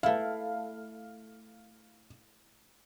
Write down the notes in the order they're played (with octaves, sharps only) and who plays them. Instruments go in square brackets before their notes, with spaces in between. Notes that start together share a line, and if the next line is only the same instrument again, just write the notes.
[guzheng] A3 E4 [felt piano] F5